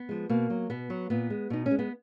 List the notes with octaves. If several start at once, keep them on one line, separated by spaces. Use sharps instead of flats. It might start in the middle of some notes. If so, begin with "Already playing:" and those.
Already playing: B3
F3 G#3
B2 A#3
F#3
B2 B3
F#3
A#2 B3
G#3
B2 D#4
C#4
G#3
B3